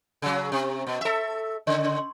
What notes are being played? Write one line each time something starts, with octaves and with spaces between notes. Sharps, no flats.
C#3 F#3
C3
B2
A4 E5
C#3